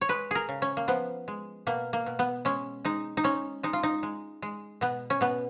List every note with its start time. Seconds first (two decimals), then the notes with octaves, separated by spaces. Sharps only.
0.01 C#5
0.09 G#3 B4
0.31 G#4 A#4
0.49 C#3
0.62 C#4
0.77 A#3
0.88 F3 B3
1.28 G#3
1.67 B2 A#3
1.93 A#3
2.06 B2
2.19 B3
2.45 G#3 C#4
2.85 G#3 D#4
3.17 D#4
3.24 G#3 C#4
3.63 G#3 D#4
3.73 F4
3.83 D#4
4.03 G#3
4.42 G#3
4.81 B2 B3
5.10 C#4
5.21 B2 B3